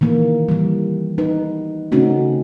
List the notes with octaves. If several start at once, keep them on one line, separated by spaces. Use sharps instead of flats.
D#3 E3 A#3
E3 G3
D#4 B4
C#3 A3 C4 C#4 D#4 F#4